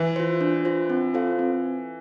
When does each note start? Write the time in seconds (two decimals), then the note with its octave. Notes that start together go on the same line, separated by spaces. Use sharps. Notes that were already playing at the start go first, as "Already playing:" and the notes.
Already playing: E3
0.16 F4 C5
0.41 D4
0.65 F4 C5
0.90 C4
1.14 F4 A4 C5 F5
1.39 C4